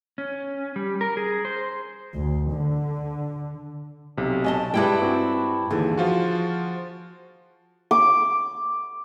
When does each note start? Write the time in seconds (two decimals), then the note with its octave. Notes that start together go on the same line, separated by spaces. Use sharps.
0.18 C#4
0.76 G3
1.01 A#4
1.17 G#4
1.45 C5
2.14 D2
2.52 D3
4.17 B1 C3
4.44 C#4 D#5 A5
4.74 G2 G3 G#3 E4 G5
5.01 C4 F#4
5.70 D#2 D3 E3 G#4
5.97 F3 F4 F#4
7.91 D6